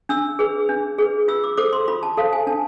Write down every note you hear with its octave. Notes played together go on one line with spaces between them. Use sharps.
D4 E6
G#4 B4
D4
G#4 B4
F4 E6
D6
A4 C5 D6
C6
F4 B5
A5
A4 C5 F5
G#5
D4 A5